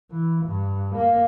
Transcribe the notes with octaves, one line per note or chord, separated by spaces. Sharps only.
E3
G2
A#3